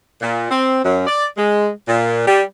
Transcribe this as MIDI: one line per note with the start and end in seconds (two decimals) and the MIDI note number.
0.22 0.51 46
0.51 0.83 60
0.84 1.04 42
1.06 1.25 74
1.37 1.68 56
1.88 2.23 46
2.27 2.42 55